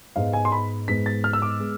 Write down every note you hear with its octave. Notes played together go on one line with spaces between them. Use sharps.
G#2 G#3 B3 F5
G#5
C6
B5
G#2 G#3 B3 B6
A6
F6
E6
D6
G#3 B3